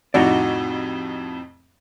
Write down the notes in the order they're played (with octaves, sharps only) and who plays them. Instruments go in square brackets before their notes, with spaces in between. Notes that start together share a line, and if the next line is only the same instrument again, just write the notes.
[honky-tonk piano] F2 A2 C3 [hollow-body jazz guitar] D#4 F#4 D5